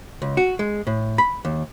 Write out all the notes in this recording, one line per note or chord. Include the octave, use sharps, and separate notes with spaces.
C#2
F#4
G#3
A2
B5
D#2